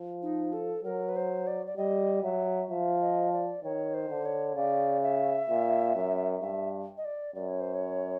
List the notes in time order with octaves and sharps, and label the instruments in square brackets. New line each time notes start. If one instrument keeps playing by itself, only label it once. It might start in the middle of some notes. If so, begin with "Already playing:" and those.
Already playing: [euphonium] F3
[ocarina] D#4
A4
[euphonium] F#3 [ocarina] A#4
[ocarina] B4
C5
D5
D5
[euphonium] G3 [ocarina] D#5
[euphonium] F#3 [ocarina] E5
[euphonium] F3 [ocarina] E5
[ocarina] D#5
D5
[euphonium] D#3 [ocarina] C#5
[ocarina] C5
[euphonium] D3
[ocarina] C#5
[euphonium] C#3 [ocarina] D5
[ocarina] E5
[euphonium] A#2
F#2
[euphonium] G2 [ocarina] E5
[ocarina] D#5
D5
[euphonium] F#2 [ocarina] D5
[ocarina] C#5
C5
C#5